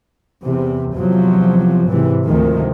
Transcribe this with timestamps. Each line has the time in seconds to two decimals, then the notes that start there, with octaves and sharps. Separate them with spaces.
0.42 E2 C3
0.95 E2 C3 F3 F#3
1.87 G#2 C3 E3
2.24 D2 C3 D#3 F3 G#3